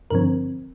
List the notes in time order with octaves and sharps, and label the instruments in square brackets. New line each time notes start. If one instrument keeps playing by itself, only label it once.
[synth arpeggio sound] G2 D3 F3 C4 A#4